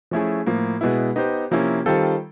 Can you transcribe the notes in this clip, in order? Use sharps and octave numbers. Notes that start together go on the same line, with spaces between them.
F3 A3 C#4 E4 G#4
A2 F3 A#3
B2 G#3 B3 E4
B3 D#4 G4 C5
C3 F3 A#3 C#4 E4
D#3 G3 C4 F4 A4